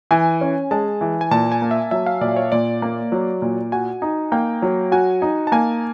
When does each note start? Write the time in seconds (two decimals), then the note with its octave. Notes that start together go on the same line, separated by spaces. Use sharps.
0.11 E3 G#5
0.41 C#4
0.71 G#3 A5
1.01 E3
1.21 G#5
1.31 A#2 A5
1.52 G#5
1.61 A#3
1.71 E5
1.91 F#3 E5
2.06 F5
2.21 A#2 D5
2.36 C#5
2.52 A#2 D5
2.82 A#3
3.12 F#3
3.42 A#2
3.72 F#4 G#5
4.02 D#4
4.32 A#3 G5
4.62 F#3
4.92 F#4 G#5
5.22 D#4
5.47 A5
5.52 A#3 G#5